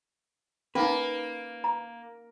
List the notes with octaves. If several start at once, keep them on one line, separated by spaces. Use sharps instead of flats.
A#3 C#4 D#4 B4
A#5